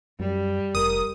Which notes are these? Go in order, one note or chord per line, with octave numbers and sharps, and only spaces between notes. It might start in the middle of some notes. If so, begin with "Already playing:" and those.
F#2 G3
F1 A#4 D#6